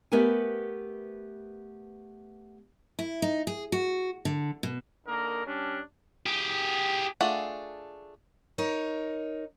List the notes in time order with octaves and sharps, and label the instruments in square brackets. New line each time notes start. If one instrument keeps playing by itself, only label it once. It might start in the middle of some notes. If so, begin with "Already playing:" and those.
[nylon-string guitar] A3 B3 G4 A#4 B4 G#5
[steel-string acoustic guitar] E4
D#4
G#4
F#4
D3
B2
[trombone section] D3 A#3 D#4 A#4
G3 C#4 D4
[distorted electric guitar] G4 G#4
[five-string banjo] A3 D4 F4 G#4 F#5
[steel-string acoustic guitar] D#4 A#4 C#5